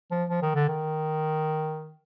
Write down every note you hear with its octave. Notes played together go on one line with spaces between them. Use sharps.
F3
F3
D#3
D3
D#3